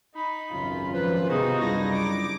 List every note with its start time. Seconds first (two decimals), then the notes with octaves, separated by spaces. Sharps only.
0.15 D#4 B5
0.52 G#1 C#2 F#2 F4
0.94 F3 B4 C5
1.30 C3 B3 D#4 F4 F#4 G#4
1.60 C#2 F#2 G3 D4 E4 A#6
1.92 D6